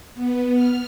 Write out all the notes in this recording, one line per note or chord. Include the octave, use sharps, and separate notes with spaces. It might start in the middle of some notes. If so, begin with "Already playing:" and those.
B3
F6